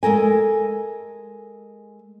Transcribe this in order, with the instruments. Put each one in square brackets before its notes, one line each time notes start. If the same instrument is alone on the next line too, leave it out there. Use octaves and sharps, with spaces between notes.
[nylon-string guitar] G#3 A4 A#4 G#5